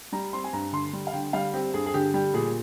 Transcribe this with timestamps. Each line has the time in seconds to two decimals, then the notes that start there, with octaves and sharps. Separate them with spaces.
0.12 G3 A#5
0.33 C4 C6
0.44 G#5
0.53 G2 A#5
0.73 D3 C6
0.93 G3
1.07 F5
1.13 D3 G5
1.33 G3 F5
1.54 C4 G4
1.74 G2 G#4
1.86 G#4
1.94 D3 G4
2.14 G3 G4
2.34 A#2 G#4